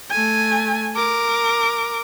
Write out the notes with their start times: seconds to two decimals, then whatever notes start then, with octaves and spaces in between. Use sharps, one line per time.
0.11 A3 G#5
0.95 A#4 D6